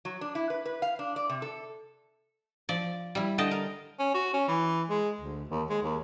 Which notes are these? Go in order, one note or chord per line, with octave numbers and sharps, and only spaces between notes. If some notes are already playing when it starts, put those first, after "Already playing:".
F#3
D4
E4
B4
B4
F5
D4
D5
C3
A4
F3 D5
G3 E4
D3 D#5 G5 A5
A#4
C#4
F#4
C#4
E3
G#3
D2
D#2
G#3
D#2